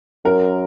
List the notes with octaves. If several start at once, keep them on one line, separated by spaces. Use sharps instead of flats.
F#2 A#4